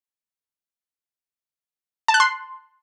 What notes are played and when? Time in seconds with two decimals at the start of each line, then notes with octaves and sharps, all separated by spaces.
2.08 A5
2.14 F#6
2.20 C6